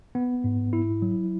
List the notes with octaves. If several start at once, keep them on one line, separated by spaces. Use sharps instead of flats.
B3
G#2
E4
F#3